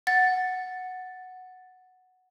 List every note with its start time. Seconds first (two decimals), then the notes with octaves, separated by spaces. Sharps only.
0.07 F#5 A6